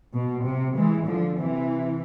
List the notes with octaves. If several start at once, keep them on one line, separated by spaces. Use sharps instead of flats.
B2
C3
E3 G#3
D3 F3
C3 E3